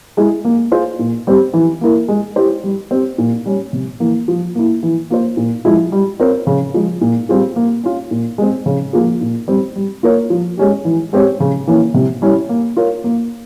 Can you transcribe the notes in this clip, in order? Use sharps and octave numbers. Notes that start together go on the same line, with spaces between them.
G#3 E4 G#4
A#3
F4 G#4 C5
A#2
G3 C4 G4
E3
A#3 E4 A#4
G#3
E4 G4 C5
G3
C4 G4
A#2
G3 C#4
C3
E3 A#3
F3
A#3 E4
E3
A#3 F4 C5
A#2
F3 G#3 E4
G3
C4 F4 A#4 C#5
C#3
F3 G#3
A#2
G3 C4 F4 G#4
A#3
C#4 F4
A#2
G#3 C4
C#3
F3 A#3 F4 G#4
A#2
G3 C4
G3
A#3 F4 A#4 C#5
F3
G#3 C#4 G4
E3
G#3 C4 G4 C#5
C#3
E3 A#3 C#4
C3
G3 C#4 E4
A#3
F4 A#4 C#5
A#3